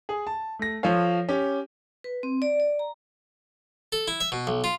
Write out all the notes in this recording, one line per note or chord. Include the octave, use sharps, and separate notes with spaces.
G#4
A5
A3 A#6
F3 F4 A4 C#5 F5
C#4 G4
B4
C4
D5
D5
A#5
A4
E4
E5
B2
B1
F4